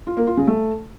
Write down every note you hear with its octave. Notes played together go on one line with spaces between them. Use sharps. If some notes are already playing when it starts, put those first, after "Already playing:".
F4
A#3
F4
C#3
A3